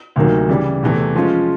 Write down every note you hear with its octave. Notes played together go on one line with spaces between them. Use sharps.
D2 C3 D#3 F#3 A#3
C#3 E3 G3
E2 C3 E3 A3
F3 G#3 C#4 F4